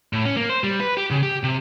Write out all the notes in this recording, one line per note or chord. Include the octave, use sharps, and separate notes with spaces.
A2
C#4
A#3
C5
G3
B4
G4
C#3
G4
C3